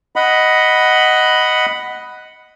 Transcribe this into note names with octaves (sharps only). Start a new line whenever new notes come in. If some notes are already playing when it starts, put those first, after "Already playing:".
D#5 F#5 B5